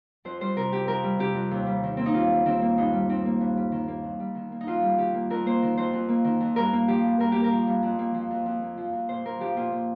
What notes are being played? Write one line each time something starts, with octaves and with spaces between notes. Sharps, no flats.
F2 C5
G3 C5
C3 A#4
F2 G4
F2 A#4
G3
C3 G4
F2
D#2
G3
D#3
A#3 C4
D#4
D#2 F4
G3
D#3 C4
A#3
G2 D#4
G3
D#3 C4
A#3
G2
G3
D#3
A#3
F2
G3
D#3
A#3
D#4
F2 F4
G3
D#3 G4
A#3
F2 A#4
A#3 C5
D#3
F2 C5
F2
A#3
D#3
F2
G2 A#4
A#3
F3 G4
G2
G2 A#4
A#3 G4
A#4
F3
G2
F2
A#3
F3
F2
F2
A#3
F3
F2
A#2 C5
A#3 A#4
F3 G4
A#2 F4
A#2